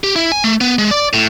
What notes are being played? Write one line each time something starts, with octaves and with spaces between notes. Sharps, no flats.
G4
E4
G#5
A3
B3
G#3
D5
A2